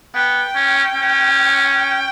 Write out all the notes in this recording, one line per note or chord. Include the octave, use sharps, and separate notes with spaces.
B3 G5
C#4
C#4
G5